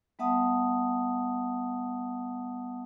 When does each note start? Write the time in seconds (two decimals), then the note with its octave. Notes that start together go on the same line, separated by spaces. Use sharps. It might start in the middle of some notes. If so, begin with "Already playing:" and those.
0.19 G3 B3 E5 F#5 A5 D#6